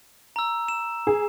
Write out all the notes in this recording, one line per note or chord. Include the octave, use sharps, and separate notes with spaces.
A#5 E6
E7
G#4